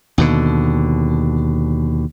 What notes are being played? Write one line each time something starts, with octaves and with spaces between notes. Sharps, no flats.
D#2 B2 D3